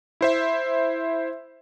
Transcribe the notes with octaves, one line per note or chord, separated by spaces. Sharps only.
E4 C5 E5